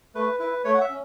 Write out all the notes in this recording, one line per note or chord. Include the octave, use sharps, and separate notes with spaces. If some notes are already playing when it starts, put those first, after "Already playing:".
A3 B4
E4 B4
A3 C#5
F#5
E5
C#4